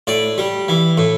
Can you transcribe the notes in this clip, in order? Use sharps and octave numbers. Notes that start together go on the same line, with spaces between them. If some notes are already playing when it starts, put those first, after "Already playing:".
A2 D5
G3
E3
A2